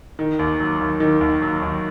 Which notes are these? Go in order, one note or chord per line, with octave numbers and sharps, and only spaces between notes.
D#3
D#2
F#3
D#2
D#3
D#2
F#3
D#2